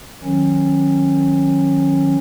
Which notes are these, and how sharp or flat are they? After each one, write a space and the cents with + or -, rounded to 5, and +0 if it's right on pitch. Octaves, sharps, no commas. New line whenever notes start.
D#3 +0 F#3 -25 C#4 -20